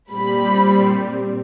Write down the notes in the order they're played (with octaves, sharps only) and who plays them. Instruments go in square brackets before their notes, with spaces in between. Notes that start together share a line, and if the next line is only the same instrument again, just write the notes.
[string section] A#2 G3 C4 B5